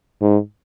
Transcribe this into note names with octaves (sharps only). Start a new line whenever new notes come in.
G#2